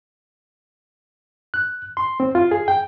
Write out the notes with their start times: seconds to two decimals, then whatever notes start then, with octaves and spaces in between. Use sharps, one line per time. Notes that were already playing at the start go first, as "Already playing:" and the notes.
1.54 F#6
1.97 C6
2.20 C4
2.35 F4
2.51 G#4
2.68 G5